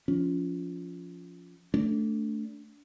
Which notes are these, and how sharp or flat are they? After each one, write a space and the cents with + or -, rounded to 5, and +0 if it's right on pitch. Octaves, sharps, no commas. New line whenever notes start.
F3 +0 C#4 +25
A3 +0 D4 -20